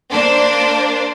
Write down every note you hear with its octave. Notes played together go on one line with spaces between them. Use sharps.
A#3 D4 C5